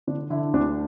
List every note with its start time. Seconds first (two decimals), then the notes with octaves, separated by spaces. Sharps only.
0.07 D3 D4
0.30 D3 E4
0.53 D2 D4